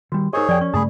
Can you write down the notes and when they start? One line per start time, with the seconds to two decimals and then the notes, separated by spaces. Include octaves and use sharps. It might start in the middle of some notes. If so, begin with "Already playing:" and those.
0.12 D#3 G3 F#4
0.33 D#4 G4 G#4 A#4 C5 C#5 D#5
0.49 F2 F3 D5 G5
0.61 C#4 C#6
0.74 G2 C#3 A3 G#4 A5 B5